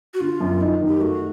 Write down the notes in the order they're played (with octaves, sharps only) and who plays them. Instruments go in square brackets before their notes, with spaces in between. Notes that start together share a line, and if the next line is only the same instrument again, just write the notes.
[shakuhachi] F#4
[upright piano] D3 [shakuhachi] F4
[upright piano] F#2
[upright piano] D#4 [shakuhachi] E4
[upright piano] D#3
[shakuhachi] G4
[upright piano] A3 [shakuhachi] F#4